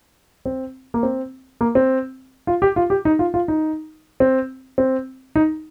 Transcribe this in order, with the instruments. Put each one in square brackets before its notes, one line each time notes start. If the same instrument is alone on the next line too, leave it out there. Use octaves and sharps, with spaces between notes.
[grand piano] C4
A#3
C4
A#3
C4
F4
G4
F4
G4
D#4
F4
F4
D#4
C4
C4
D#4